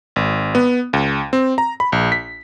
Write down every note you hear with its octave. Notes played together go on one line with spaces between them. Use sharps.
G#1
B3
C#2
C4
A#5
B5
A#1
B6